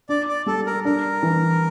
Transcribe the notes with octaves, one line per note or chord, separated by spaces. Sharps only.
D4 D5
D5
G3 A4
A#4
D4 A#4
E3